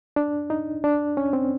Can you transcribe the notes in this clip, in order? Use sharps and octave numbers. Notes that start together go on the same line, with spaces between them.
D4
D#4
D4
C#4
C4